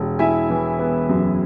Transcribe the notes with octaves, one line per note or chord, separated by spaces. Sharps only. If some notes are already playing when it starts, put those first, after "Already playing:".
Already playing: E1
E4 E5 G#5
E3
B3
F#2